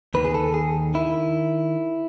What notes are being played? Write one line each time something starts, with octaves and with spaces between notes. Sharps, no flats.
D#2 D#3 B4
G#4
A4
G#4
D#3 E4